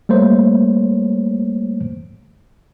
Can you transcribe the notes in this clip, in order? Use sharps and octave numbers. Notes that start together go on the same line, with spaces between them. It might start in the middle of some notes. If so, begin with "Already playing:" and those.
G3 A3 A#3 C5 C#5